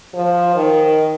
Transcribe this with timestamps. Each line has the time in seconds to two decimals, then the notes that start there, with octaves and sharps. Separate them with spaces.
0.15 F3
0.56 D#3